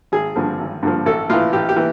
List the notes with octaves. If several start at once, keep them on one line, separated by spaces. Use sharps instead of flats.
G#1 G#4
G2 D3 F3
G#1
G2 D3 F3
A1 A4
A2 E3 F4
A1 G4
G4
E3